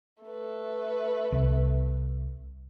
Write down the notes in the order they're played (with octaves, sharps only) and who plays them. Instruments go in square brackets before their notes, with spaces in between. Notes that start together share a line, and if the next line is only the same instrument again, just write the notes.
[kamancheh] A3 B4
[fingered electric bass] C2